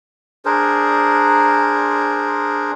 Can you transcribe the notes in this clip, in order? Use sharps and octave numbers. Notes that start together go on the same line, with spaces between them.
D4 G#4 A#4 C5